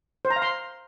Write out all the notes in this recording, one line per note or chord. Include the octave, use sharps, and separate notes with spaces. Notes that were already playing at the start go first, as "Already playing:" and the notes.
C5
A#5
F5
C6